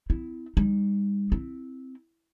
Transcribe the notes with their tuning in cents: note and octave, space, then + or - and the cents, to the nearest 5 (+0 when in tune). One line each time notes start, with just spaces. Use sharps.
C4 -40 E4 +0
G3 +40 D#4 +0
C4 +0 E4 +0